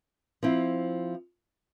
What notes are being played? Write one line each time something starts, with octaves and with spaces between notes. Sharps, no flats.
F3 C4 E4